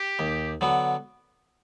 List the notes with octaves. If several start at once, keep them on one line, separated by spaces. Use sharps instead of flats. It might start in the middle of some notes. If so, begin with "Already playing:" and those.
Already playing: G4
D#2
D3 F#3 B3